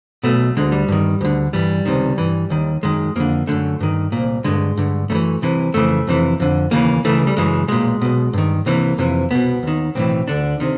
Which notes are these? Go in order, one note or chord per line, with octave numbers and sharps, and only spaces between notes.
B1 B2 A3
D2 D3 G#3
G3
G2 D#3
D2 D3
G2 E3 G3
C#2 C3 D#3
G2 E3
D#2 D#3
F#2 D#3 G#3
F2 D3 A#3
F#2 D3 A3
G2 D#3
C2 A#2
G2 D3 G#3
G2 D3
F#2 C#3 E3 A3
C2 C3 E3
F2 C#3 E3 A3
F2 C3 E3
F2 D3
D#2 C#3 E3 A#3
C#2 C#3 E3 A3
G3
F#2 C#3 E3 G#3
B1 A#2 G#3
B1 B2
G2 D#3
C2 C3 E3 A#3
F2 C3 E3
C2 B2 B3
D#2 D#3
B1 A2 E3 C4
D2 D3 D4
C3 D#3